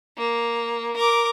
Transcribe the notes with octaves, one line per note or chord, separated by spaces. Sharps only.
A#3
A#4 D6